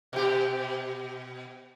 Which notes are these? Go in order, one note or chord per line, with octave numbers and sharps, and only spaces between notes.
B2 G4